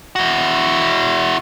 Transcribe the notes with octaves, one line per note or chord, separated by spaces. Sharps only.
E4 F#4